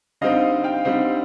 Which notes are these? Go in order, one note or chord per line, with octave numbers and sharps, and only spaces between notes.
D3 G3 C4 D#4 D#5 F5
F5 G5
D3 G3 C4 D#4